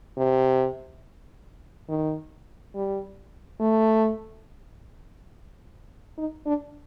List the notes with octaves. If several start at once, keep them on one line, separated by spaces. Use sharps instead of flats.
C3
D#3
G3
A3
D#4
D4